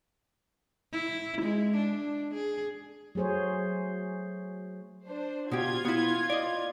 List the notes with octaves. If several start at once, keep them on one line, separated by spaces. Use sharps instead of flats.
E4
G#3
D4
G#4
F#3 A3 G#4 C5 C#5
D4 C5
B2 F4 G4 G#6
B3 E4
D5 D#5